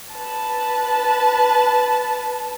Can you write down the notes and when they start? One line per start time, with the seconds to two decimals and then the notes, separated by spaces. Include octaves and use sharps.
0.13 B4 A5